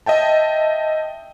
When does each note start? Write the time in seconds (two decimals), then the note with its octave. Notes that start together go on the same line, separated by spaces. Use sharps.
0.06 D#5 E5 G5 A5